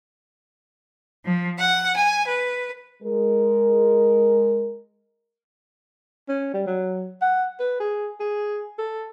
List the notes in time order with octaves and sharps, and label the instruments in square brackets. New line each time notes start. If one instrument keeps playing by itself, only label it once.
[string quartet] F3
F#5
G#5
B4
[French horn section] G#3 A#4
[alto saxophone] C#4
G3
F#3
F#5
B4
G#4
G#4
A4